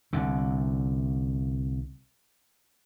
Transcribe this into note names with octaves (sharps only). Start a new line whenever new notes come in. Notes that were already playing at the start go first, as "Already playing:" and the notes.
C2 D3